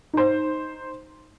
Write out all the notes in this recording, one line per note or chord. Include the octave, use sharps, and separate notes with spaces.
D#4 C5